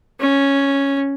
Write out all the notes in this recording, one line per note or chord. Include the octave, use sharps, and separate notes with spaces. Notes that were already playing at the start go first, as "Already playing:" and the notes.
C#4